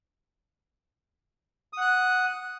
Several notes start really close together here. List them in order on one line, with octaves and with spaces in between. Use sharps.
D#6 F#5 F#6